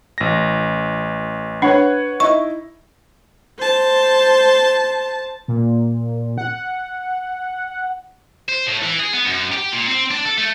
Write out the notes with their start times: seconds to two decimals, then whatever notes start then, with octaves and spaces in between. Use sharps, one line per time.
0.18 A1 A#6
1.62 D4 B4 C#5 F#5
2.20 D#4 E4 C#6
3.58 C5 A5
5.48 A#2
6.38 F#5
8.49 C5
8.67 A2
8.82 E3
8.99 G#4
9.13 B3
9.26 F#2
9.52 G4
9.72 A#2
9.88 C4
10.11 D4
10.25 A4
10.38 A3